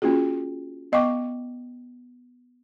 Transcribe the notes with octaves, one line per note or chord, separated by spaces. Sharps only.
A#3 C#4 F4 F#4 G#4
B3 D#5 F5 G5 C#6 D6